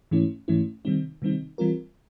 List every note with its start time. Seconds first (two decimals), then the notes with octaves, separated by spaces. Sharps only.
0.11 G#2 E3 A3 C#4 E4
0.48 G#2 E3 A3 C#4 E4
0.85 C3 D#3 G3 C4 D#4
1.22 C3 D#3 G3 C4 D#4
1.58 E3 G3 C4 F4 A#4